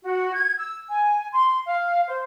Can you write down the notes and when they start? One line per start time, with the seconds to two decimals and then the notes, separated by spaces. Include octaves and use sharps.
0.03 F#4
0.34 G#6
0.57 E6
0.89 G#5
1.32 C6
1.66 F5
2.07 C5